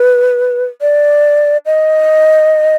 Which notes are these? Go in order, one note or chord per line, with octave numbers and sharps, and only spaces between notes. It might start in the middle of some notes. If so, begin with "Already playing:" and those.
Already playing: B4
D5
D#5